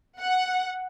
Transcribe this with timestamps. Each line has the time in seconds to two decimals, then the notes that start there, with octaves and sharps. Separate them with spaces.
0.18 F#5